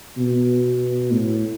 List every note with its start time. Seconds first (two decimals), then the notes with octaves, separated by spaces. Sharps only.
0.17 B2
1.12 A2